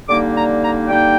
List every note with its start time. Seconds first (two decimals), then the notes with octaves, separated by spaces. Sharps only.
0.09 D3 G3 A#3 D#4 D6
0.35 A#5
0.62 A#5
0.88 D3 G3 A#3 D#4 G5